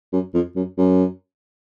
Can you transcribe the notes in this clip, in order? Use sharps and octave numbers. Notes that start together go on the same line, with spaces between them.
F#2
F2
F#2
F#2